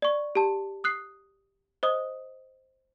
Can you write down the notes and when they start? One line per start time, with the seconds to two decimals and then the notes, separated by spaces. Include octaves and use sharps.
0.02 D5 C#6
0.35 G4 A5
0.84 D#6 F#6 C7
1.83 C5 D#5 D#6